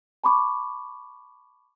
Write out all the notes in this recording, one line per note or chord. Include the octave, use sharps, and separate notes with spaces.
A5 B5 C#6 D6